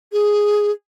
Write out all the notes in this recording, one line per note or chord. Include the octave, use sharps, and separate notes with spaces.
G#4